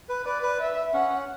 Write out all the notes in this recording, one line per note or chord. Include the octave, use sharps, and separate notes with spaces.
B4
B4 D5
B4
E5
C#4 F#5